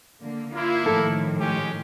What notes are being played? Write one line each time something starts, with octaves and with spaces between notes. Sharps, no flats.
D3 A#3
A#3 E4 F4
A2 D#3 F3 A4
G#3 C#4 G4